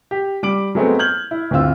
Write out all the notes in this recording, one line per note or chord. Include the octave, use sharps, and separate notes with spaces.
G4
G3 D6 D7 F#7
F#3 G#3 A3 B3 C4
F6 G6 G#6 F#7
E4
D1 G2 C4 F4 E6